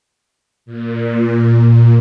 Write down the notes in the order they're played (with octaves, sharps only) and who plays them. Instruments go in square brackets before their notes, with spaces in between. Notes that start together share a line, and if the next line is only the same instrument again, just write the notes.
[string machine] A#2